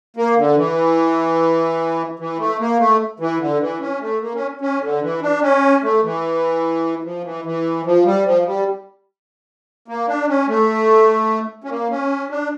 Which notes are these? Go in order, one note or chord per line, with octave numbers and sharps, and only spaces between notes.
A#3
D3
E3
E3
A3
A#3
A3
E3
D3
E3
C#4
A3
A#3
C#4
C#4
D3
E3
D4
C#4
A3
E3
F3
E3
E3
F3
G3
F3
G3
A#3
D4
C#4
A3
C#4
A#3
C#4
D4